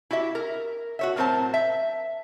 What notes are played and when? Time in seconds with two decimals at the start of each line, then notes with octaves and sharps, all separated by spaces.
0.11 E4 F#4 G4 E5
0.35 A#4
0.99 F#4 C#5 E5
1.16 A2 F#3 C4 A#4 C5 A5
1.54 E5